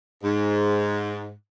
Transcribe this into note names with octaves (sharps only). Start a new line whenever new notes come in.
G#2